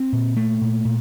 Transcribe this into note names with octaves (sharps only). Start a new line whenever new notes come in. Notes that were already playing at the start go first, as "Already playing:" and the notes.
Already playing: C4
A#2
A3
A#2
A#2